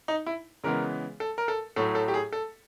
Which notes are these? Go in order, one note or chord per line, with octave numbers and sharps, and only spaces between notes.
D#4
E4
C#3 E3 G#3 B3 A#4
A4
A#4
A4
A2 F#3 A3 A4
A4
G4
G#4
A4